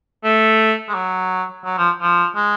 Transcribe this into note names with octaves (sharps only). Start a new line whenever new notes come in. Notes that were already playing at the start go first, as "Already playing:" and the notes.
A3
G#3
F#3
F#3
F3
F3
G#3